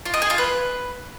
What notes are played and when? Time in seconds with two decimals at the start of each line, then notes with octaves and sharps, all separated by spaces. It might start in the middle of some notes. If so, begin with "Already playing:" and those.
0.05 F4
0.14 D#5
0.22 G#4
0.30 F4
0.38 B4